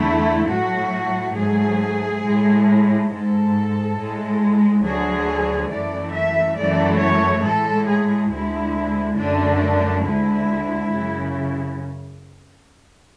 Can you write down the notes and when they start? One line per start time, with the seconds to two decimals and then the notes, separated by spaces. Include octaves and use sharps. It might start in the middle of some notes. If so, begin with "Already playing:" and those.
Already playing: E2 D3 A3 E4
0.49 A2 F#3 A3 F#4
1.36 G#2 F#3 A3 G#4
2.23 A2 G#3
3.10 G#2 G#3 A4
3.97 A2 G#3
4.83 D2 D3 F#3 G#4
5.70 F#2 E3 A3 D5
6.14 E5
6.57 F#2 E3 A3 D5
7.01 C#5
7.44 A2 G#3 A4
7.88 G#4
8.31 D2 D3 G#3 E4
9.17 F#2 D3 A3 D4
10.05 D2 D3 G#3 E4
10.92 F#2 C#3